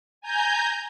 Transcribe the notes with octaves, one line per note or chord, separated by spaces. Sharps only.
G#5 A#5 G6